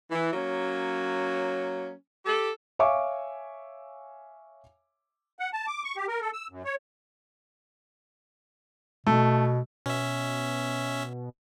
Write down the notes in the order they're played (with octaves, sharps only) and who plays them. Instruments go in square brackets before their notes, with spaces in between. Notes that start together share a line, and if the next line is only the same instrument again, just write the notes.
[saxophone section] E3
F#3 A#3 C#4
G4 A4
[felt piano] C#5 E5 F5 G#5 C#6 D6
[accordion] F#5
A5
D6
C#6
G4
A#4
A4
E6
F#2
C#5
[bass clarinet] B2 [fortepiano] A3
[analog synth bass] B2 [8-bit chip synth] C#4 E5